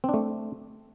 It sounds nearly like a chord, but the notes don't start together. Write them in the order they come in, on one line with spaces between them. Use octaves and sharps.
C4 D4 A3